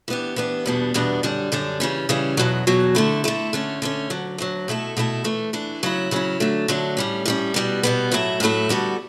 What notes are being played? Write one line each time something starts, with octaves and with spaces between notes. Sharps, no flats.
E3 B3 D4 G4
E3 B3 D4 G4
E2 B2 G3 B3 D4
E2 B2 G3 B3 D4
F#2 D3 G3 D4
F#2 D3 G3 D4
C#3 E3 G3 C#4
C#3 E3 G3 C#4
E2 B2 F#3
E2 B2 F#3
D3 A3 E4
D3 A3 E4
D3 A3 C#4
D3 A3 C#4
D2 D3 F#3
D2 D3 F#3
B2 A3 E4 A4
B2 A3 E4 A4
E3 A3 D4
E3 A3 D4
C#3 F#3 C#4 E4
C#3 F#3 C#4 E4
D3 F#3 A3 D4
D3 F#3 A3 D4
A2 G3 C#4
A2 G3 C#4
B2 G3 B3
B2 G3 B3
A2 F#3 A3 E4
A2 F#3 A3 E4
D3 G3 B3 F#4 A4